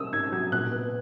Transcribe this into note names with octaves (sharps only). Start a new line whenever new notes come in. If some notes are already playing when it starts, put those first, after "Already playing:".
Already playing: A#3 C#4 D#6 E6
G#2 G#6
F#3 G#6
A#2 F#6
B3